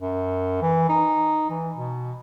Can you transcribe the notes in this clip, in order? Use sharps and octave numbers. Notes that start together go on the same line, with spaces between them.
F#2
E3
D#4
E3
B2